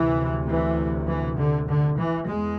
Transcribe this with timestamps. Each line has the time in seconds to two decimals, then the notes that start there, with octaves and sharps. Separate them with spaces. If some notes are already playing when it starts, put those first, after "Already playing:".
Already playing: D2 C3 E3
0.47 E3
1.07 E3
1.37 D3
1.68 D3
1.98 E3
2.27 E2 G#3